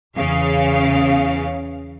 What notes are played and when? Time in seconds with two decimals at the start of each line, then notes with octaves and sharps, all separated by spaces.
0.16 E2 C#3 F5